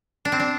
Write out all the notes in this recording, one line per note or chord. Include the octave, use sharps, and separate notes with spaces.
D4
C4
D4